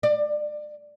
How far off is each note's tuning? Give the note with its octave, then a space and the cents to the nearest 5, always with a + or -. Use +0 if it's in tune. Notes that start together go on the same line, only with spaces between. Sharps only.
D5 +25